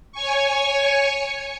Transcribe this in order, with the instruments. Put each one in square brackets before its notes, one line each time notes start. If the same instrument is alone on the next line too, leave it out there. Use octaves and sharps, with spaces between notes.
[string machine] C#5 G#5 C#6